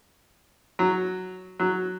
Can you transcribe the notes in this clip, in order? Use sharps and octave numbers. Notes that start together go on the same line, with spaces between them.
F#3
F#3